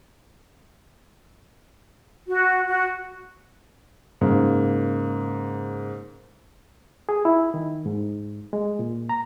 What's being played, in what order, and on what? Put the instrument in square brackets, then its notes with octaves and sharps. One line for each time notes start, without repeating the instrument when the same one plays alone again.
[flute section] F#4
F#4
[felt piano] G#2 C#3 A#3
[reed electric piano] G#4
E4
D#3
G#2
G#3
A#2
A#5